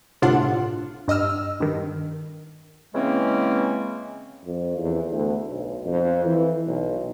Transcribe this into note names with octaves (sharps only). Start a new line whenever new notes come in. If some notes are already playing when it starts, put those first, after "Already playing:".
G1 A2 C3 D4 F4 F#5
G2 D#5 E6 F6
G2 D#3
C#3 E3 G#3 A#3 C4 C#4
F2
E2
D2
B1
F2
E3
B1